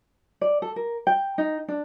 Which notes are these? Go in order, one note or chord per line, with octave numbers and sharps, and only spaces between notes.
D5
A4
A#4
G5
D#4
D4